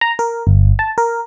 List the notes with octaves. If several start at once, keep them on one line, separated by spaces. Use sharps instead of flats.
A#5
A#4
G1
A5
A#4